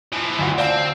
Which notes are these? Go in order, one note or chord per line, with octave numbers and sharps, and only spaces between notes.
E3 F3
D2 F4 F#4
C4 D5 F5 A5